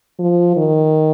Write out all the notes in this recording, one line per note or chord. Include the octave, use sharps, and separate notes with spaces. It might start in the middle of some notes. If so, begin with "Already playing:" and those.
F3
D#3